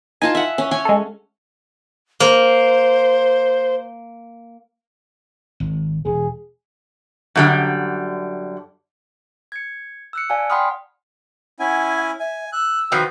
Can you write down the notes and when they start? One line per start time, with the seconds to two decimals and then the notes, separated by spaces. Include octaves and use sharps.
0.22 D#4 F4 G#5 A5
0.35 E5 F#5
0.58 C#4
0.71 C#4 C#5 G#5
0.85 G#3 A4
2.20 A#3 C5
5.60 G#1
6.05 E1 G#4
7.36 F#2 D3 G3
9.52 G#6 C#7
10.13 E6 F#6 C#7
10.30 D5 F5 G#5 A5
10.50 F#5 G5 B5 C6 D#6 F6
11.60 C#4 E4 F#5 G#5
12.20 E5 G#5
12.52 E6 F#6
12.92 D#3 F3 F#4 B4